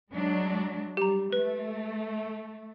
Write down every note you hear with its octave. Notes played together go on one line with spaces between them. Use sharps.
F#3 G#3 D4
G3 G4 A#5
A3 B4